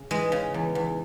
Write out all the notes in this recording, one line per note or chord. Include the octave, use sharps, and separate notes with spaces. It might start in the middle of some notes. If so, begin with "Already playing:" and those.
Already playing: C#3
E3 G#3
C#3
E2
E2